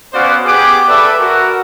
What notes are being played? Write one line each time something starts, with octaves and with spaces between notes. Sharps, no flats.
B3 C#4 F#4 C5 D5 F5
B3 G4 G#4 F#5 D6
A4 B4 D5 E5
F#4 A#4